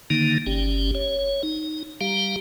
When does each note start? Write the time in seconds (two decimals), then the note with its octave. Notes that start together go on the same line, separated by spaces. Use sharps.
0.10 D3 D#3 A#3 D#4
0.46 G1 C#4 G4
0.95 C#5
1.43 D#4
2.01 G3 G4 F5 A#5